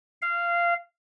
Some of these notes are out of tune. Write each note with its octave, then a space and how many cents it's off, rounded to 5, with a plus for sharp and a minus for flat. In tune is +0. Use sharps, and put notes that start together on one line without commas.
F5 -15